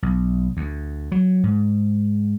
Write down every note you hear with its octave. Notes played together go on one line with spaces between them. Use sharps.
B1
D2
F#3
G#2